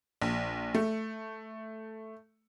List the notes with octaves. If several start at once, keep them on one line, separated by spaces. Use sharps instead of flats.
A#1
A3